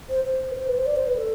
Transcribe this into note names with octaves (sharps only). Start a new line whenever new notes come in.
C5
C5
B4
C5
B4
C5
D5
C5
B4
A4